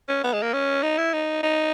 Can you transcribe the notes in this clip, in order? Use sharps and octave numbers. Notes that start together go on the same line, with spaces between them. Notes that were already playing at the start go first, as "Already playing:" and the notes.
C#4
B3
G#3
A#3
C#4
D#4
E4
D#4
D#4